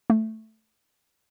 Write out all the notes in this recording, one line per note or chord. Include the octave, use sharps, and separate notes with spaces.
A3